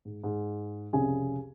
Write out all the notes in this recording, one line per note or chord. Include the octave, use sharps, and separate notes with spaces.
G#2
G#2
C2 F2 C#3 G#4 G#5